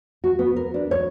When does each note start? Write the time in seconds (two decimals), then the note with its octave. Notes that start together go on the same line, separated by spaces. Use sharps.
0.24 F#4
0.39 B3
0.56 A#4
0.74 D4
0.91 C#5